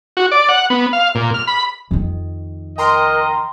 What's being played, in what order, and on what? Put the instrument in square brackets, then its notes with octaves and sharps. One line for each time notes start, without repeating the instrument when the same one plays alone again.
[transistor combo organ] F#4
D5
F#5
B3
F5
A#2
F6
B5
[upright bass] F2 D#3
[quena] A#4 [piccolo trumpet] D#5 [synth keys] G5 A#5 C6